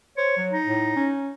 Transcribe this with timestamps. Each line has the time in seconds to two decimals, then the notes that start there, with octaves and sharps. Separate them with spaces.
0.17 C5 C#5
0.36 F#3
0.51 D#4
0.66 A2
0.96 C#4